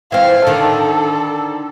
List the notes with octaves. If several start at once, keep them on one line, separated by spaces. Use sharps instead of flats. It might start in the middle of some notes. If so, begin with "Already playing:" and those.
E3 C4 F5
D3 D#3 A4